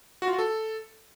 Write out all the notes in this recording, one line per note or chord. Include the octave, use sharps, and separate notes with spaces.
F#4
F4
F#4
A4